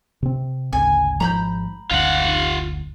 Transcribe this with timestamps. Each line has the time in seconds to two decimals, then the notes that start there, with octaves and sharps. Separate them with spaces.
0.22 C3 C4
0.73 G#1 D2 C#3 G#5
1.20 G#1 F3 G#3 A#5 B5 G6
1.91 F#1 D2 F4 F#5